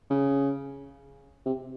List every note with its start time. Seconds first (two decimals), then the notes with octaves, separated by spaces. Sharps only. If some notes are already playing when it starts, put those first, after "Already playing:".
0.10 C#3
1.46 C3